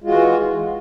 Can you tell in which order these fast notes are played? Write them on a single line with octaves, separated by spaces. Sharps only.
G#3 F4 F#4 E3